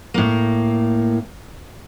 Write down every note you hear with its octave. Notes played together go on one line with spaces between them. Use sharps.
A2 A#3